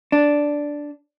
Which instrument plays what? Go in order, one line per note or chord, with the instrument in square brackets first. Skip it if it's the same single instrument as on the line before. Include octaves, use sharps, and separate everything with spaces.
[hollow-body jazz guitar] D4